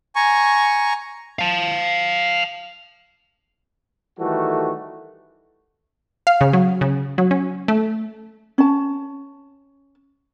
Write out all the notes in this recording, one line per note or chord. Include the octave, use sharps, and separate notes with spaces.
G#5 A#5 C#6
F5 A5
D#3 E3 G3 A3 F#4 A4
F5
C#3
F#3
C#3
F#3
C#4
A3
C#4 A5